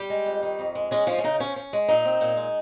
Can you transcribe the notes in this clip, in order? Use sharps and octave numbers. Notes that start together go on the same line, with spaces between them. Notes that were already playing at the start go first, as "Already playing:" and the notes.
Already playing: G3 G4
G#3
F2
D#3
F2
G#3
G#3 C#4 G#4
F3 G#3 F4
C#4
C#3 D#4
F3 C#4
C#4
G#3
A#2 D#4
C4
A#2
G#3